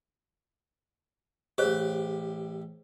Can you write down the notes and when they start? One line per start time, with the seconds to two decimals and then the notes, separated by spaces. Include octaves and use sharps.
1.58 A1 G4 G#4 C5 C#5